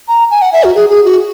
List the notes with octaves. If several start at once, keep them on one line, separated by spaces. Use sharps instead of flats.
A#5
G#5
F#5
E5
F#4
G#4
G#4
F#4